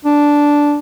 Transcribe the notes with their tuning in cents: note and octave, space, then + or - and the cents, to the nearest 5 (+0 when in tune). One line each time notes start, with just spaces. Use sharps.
D4 -5